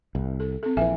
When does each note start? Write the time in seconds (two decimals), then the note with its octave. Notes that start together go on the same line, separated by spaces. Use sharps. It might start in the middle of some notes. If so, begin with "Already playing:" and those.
0.15 C2
0.40 A4
0.63 C4 A4
0.77 A#1 E3 E5 G#5